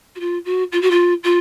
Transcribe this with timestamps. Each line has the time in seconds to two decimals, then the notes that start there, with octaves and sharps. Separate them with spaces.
0.15 F#4
0.20 F4
0.45 F#4
0.72 F4
0.81 F#4
0.90 F4
1.23 F4